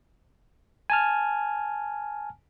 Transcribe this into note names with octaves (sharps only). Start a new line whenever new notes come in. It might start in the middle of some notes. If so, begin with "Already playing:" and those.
G#5 A5 F6